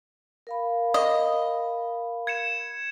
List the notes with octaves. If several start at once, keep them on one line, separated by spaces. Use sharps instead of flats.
A#4 F5 B5
D#5
G#6 C#7 E7